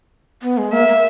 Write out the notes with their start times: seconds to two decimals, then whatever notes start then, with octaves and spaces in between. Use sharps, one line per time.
0.42 B3
0.58 G#3
0.72 A#3 E5
0.88 A#3